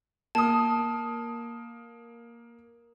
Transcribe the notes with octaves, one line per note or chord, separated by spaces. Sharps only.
A#3 A5 D#6